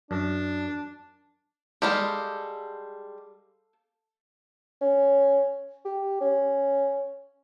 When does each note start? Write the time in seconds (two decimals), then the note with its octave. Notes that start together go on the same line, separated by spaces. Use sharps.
0.11 F#2 D4
1.82 G3 G#3 G4 A4 F5
4.81 C#4
5.85 G4
6.21 C#4